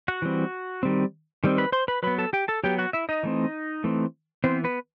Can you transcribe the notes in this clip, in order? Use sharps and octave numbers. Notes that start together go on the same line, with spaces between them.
F#4 F#5
E3 G3 C4
D#3 G3 C4
D#3 G3 C4
B4 B5
C5 C6
B4 B5
F#3 B3 B4 B5
A4 A5
G4 G5
A4 A5
F#3 B3 G4 G5
F#4 F#5
E4 E5
D#4 D#5
E3 A3 C4
E3 A3 C4
E3 B3 C4 C5
B3 B4